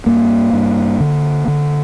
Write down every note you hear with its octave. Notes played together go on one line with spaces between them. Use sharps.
G2 A#3
G2
D3
D3